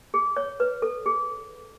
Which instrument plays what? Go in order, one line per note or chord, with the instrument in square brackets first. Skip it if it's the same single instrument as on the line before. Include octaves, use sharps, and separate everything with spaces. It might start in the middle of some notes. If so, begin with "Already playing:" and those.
[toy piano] G#4
C#5
B4
A4
G#4